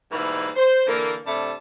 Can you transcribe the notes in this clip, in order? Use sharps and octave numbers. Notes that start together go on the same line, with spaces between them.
G#2 B2 E3 G3 A#3
C5
D3 E3 A#3
G2 C3 A3 D5 A5